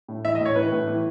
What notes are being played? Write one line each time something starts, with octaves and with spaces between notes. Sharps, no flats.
A2
E3 E5
D#5
A2 C#5
E3 B4
A2
E3